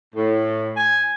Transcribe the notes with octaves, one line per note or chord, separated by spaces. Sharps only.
A2
G#5